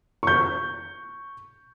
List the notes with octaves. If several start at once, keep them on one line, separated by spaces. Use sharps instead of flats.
C#6 G6